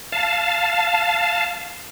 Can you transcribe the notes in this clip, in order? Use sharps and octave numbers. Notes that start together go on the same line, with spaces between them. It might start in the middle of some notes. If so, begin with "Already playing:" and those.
F5 A5